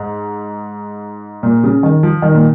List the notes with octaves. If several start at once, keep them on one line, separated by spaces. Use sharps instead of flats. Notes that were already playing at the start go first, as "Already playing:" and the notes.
Already playing: G#2
A#2
C#3
D#3
F3
D#3
A#2